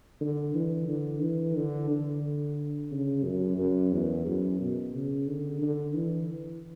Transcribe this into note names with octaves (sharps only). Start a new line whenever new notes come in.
D3
E3
D3
E3
D3
D3
C#3
F#2
F#2
E2
F#2
B2
C#3
D3
D3
E3